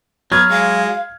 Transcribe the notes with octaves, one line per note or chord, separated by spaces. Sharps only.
F#3 B3 F6 G#6
G#3 F5